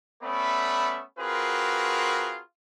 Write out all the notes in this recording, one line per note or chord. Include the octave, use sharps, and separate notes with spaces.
A3 B3 C#4 D5 E5 B5
C4 F4 F#4 G#4 A#4 B4